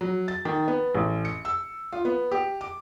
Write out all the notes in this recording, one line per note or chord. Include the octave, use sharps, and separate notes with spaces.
F#3
A6
D#3
B3
A1
C#7
E6
F4
B3
G4
D6